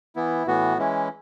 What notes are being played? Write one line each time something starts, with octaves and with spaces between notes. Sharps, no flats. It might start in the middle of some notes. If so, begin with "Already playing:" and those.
E3 B3 E4
A2 E3 B3 F#4
E3 G#3 C#4 E4